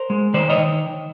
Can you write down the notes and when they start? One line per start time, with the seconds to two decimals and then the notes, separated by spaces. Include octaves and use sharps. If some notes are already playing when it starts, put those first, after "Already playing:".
Already playing: A#4 C5
0.10 G#3
0.34 D#3 C5 D5
0.50 C#5 D#5
0.58 D#3